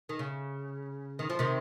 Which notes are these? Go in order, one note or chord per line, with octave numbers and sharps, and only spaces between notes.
D#3
C#3
D#3
F3
C3 D#3